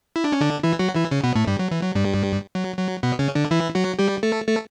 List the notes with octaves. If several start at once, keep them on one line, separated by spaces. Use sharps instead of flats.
E4
D4
C#4
D3 D4
E3 E4
F#3 F#4
E3 E4
C#3 C#4
B2 B3
A2 A3
G2 G3
F#3
E3
F#3
G2 G3
F#3
F#3
B2 B3
C#3 C#4
D3 D4
E3 E4
F#3 F#4
G3 G4
A3 A4
A3 A4